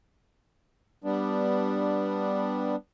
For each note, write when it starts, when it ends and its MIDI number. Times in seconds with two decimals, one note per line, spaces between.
1.04 2.76 55
1.04 2.76 59
1.04 2.76 62